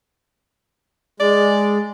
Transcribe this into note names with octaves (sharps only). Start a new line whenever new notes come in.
G#3 D5